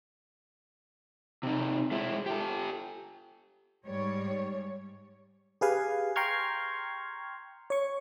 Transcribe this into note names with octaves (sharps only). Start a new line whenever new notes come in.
C3 D#4
G#3 E4
G4 A4
G#2 G3 C#5
G4 G#4 B4 F5 G#5
G5 A#5 C6 C#6 F6 G#6
C#5 C#6